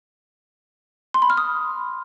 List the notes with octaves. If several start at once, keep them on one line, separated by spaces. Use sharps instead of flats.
C6
B5
F6
D#6